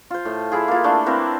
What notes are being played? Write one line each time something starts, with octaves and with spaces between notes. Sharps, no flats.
F4 C5
A2
E4 F4 G#4
A#3 F4
A3 A#3 D4 E4
C4 E4 A#4 B4